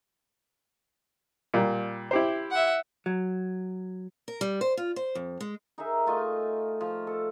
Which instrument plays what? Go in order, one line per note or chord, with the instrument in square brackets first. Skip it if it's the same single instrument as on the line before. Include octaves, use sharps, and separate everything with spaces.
[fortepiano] A#2 G3
E4 G4 C5
[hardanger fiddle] E5 F#5
[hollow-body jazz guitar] F#3
[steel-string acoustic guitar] A#4
G3
C5
F4
C5
F2
G#3
[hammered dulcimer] D#4 G#4 A#4 E5
A3 F4 D#5 G#5
F3
A4